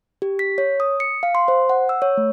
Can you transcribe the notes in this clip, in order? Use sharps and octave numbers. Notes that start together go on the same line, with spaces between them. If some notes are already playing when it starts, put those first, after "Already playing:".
G4
B6
C#5
D#6
C#7
F5
C6
C5
F#5
E6
C#5
A3